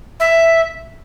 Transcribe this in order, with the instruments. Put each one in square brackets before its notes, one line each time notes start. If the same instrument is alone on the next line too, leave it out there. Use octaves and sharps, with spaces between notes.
[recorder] E5